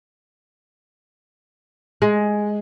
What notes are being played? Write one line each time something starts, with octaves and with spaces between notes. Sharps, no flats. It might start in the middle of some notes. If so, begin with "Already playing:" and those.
G#3